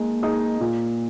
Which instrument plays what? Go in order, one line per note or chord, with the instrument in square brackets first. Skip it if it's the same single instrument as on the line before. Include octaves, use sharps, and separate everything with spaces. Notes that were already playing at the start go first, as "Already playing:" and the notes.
Already playing: [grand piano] G#3 D#4 [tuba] A#3
[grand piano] D#4 G#4 D#5
[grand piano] A#2 [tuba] A#3